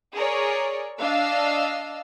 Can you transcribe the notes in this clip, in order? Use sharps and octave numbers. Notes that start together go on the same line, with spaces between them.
G#4 A#4 C#5 D5
D4 D#5 F5 E6